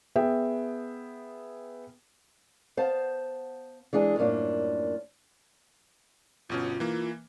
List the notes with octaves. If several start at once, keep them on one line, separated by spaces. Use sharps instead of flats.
B3 G#4 E5 G5
B3 C5 F5 A5
E3 G#3 D4 G#4
F#2 A2 G3 A#3 D4 F4
G1 B2 C#4 F4
E3 A#3